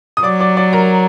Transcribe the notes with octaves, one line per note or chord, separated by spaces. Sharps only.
D#6
F#3 D5 D6
D5 D6
D5 D6
A#4 A#5